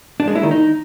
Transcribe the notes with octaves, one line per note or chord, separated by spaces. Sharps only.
D4
G#3
E4
D#3
D#4